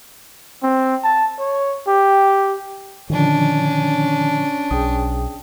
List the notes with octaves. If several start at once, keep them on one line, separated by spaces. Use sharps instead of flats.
C4
A5
C#5
G4
A#2 D3 D#3 F3 C#4 D4
B1 G#4 G5 D#6